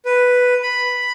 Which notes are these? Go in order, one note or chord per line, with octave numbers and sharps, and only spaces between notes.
B4
B5